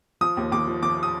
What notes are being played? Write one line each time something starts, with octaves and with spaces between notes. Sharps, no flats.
F3 D#6
D#2
D#2 D6
F3
F3 D6
D#6